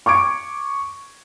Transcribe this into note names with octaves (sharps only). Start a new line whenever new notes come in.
C#6 D6 G#6 D7